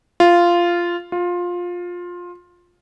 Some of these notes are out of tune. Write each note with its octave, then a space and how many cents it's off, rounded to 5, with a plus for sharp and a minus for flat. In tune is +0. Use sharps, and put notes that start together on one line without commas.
F4 -10
F4 +15